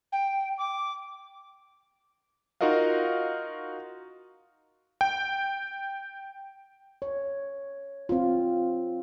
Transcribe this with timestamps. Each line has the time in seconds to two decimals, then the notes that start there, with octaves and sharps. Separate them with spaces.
0.12 G5
0.58 D6
2.61 D#4 F4 F#4 A#4 D#5 F5
5.01 G5
7.02 C#5
8.09 C4 F4